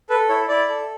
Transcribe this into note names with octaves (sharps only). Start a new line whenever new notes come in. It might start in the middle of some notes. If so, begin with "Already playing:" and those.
A4 B4
E4 C#5
E4 D5
A4